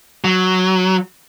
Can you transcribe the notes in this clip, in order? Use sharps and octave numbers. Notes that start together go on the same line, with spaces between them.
F#3